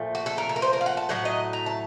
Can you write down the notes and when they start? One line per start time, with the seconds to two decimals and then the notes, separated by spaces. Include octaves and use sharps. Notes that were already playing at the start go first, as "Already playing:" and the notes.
Already playing: A#2 F3 A3
0.15 F#4
0.26 A4
0.38 A#4
0.49 A4
0.56 A#4
0.62 C5
0.73 A#4
0.81 F5
0.86 F#5
0.97 A5
1.09 A2 F#3 A3 F#5
1.25 D#5
1.53 A#5
1.66 A5